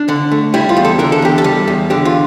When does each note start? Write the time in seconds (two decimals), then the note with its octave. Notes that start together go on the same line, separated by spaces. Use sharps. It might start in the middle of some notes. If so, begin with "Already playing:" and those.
Already playing: D4
0.09 D3
0.32 A3
0.54 G3 E4
0.69 F4
0.77 E2
0.85 A4
0.99 D3 A#4
1.12 A4
1.22 E2 G4
1.38 A4
1.44 G3
1.68 E2
1.90 D3 G4
2.05 F4